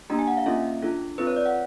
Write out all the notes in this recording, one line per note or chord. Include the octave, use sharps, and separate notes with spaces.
A#3 D4 G4 A#5
G#5
F#5
F5
A#3 C#4 F4 A4 E5
D4 F4 A4
C4 F4 A4 B4
C#5
D5
F#5